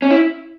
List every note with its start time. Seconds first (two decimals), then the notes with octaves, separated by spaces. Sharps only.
0.02 C#4
0.10 E4